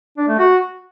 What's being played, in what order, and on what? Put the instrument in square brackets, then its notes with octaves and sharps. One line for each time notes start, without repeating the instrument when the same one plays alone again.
[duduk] D4
A3
F#4